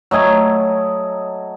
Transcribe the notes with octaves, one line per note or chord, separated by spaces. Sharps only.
F#3 A3 D#5 G#5